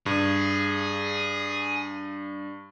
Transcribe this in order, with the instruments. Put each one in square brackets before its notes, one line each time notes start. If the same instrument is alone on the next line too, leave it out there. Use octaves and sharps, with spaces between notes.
[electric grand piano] G2 [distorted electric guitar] G#4